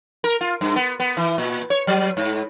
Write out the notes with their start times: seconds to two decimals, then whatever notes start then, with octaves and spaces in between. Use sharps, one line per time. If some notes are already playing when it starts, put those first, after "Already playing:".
0.24 A#4
0.41 F4
0.61 G2
0.76 B3
1.00 B3
1.17 E3
1.38 A#2
1.70 C#5
1.87 F#3
2.17 G#2